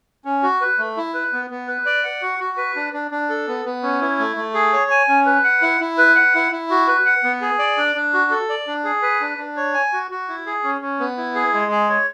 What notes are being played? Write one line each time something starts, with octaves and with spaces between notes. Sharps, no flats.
C#4
F#4
B4
A3
E4
B4
B3
B3
B4
D5
F#5
F#4
F#4
B4
D4
D4
D4
A4
B3
B3
C#4
E4
A3
A3
G#4
C#5
G#5
C#4
B4
F#5
E4
E4
B4
F#5
E4
E4
F#4
B4
F#5
B3
G#4
D5
D4
D4
F#4
A4
D5
D4
G#4
B4
D4
D4
C#5
G#5
F#4
F#4
E4
G#4
C#4
C#4
B3
E4
G#4
G#3
G#4
C#5